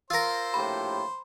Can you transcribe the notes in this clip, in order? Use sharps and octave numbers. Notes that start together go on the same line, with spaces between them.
F4 A#4 C5 E6 A#6
A#1 A2 G4 B5